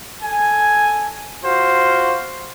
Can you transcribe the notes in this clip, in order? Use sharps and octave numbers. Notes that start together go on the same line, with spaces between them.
A4 G#5
F4 F#4 C5